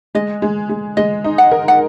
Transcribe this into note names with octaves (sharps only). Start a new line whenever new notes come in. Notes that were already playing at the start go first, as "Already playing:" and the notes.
G#3 D#5
G#3
G#3
G#3 D#5
D#4
F#5
A#4
F#5